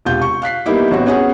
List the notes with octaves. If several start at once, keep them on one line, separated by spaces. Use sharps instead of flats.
E1 C3 F4 G6
C#6
F5 F#6 B6 C7
G3 A#3 B3 D#4 E4 G4
A1 B3 C4 F#4
B3 C#4 F#4 G#4 C#5 F#5